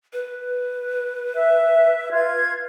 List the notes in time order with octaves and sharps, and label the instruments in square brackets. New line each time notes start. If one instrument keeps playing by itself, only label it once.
[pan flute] B4
[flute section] E5
F4 G#6